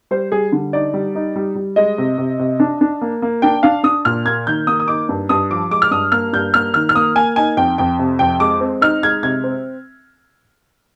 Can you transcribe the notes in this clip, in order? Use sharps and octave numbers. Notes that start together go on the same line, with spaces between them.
G3 C5
G3 G#4
D3
D#4 D5
G3
D#4
G3
G3
G#3 D#5
C3
C3
C3
D4
D4
A#3
A#3
D4 G5
D4 F5
D4 D#6
A#2 F6
A#3 G#6
D#3 G6
A#3 D#6
D#6
D#4 D6
G2
G2 D#6
F3 D6
G#3 D6
F6
G2 D#6
A#3 F6
G2 G6
A#3 F6
D#3 F6
F6
A#3 D#6
A#3 G#5
D#4 G#5
F2 G5
F2 G5
C3
F2 G5
G#3 D6
C4
D#4 F6
G#3 G#6
C3 G#6
C4